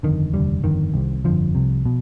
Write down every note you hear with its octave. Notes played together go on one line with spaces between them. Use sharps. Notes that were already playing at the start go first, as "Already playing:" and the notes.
G1 F2 D3 D#3
F1 D#2 D3 G3
G1 F2 D3 D#3
C2 C3
G1 F2 D3 F3
C2 C3
B2